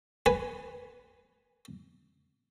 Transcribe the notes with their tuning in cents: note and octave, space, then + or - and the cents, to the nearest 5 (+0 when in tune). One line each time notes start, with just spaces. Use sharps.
B4 +0 G#5 +0